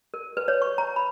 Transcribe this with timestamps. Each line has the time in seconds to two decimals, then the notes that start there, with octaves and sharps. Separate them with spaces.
0.14 A#4
0.37 B4
0.48 C#5
0.62 C#6
0.78 A#5
0.96 B5